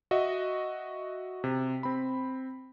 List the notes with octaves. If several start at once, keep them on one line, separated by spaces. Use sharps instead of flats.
F#4 D#5 E5
C3
C4 B5